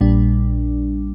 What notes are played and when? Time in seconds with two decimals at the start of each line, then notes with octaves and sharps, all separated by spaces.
0.01 A#1 A#2 G3 D4